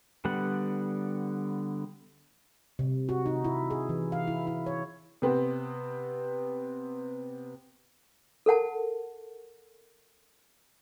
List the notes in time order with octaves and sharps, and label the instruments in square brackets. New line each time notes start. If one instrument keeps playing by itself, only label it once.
[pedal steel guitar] D3 G3 B3 F#5
[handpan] C3
F#4
D#4
E4
G#4
E3
F5
E4
E4
C#5
[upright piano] C3 B3 C4
[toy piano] A4 A#4 F#5 A5